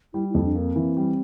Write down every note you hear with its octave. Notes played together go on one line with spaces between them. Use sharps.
G3 E4
F2 E4
D4
A#3
C4
E3
G3